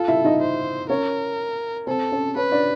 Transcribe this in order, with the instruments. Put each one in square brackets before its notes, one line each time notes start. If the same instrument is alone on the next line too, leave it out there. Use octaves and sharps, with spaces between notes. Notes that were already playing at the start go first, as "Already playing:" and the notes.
Already playing: [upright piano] F4 F5 [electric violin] A4
[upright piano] E4 E5
D#4 D#5
[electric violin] C5
[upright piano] C#4 C#5 [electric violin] A#4
[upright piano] C4 C5 [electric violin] A4
[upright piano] C#4 C#5
[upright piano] C#4 C#5 [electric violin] B4
[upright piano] D4 D5